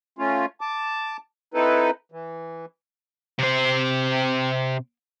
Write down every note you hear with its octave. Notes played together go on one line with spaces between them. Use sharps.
A3 C#4 F4
A5 D6
C4 D#4 E4 A4 B4
E3
C3 C5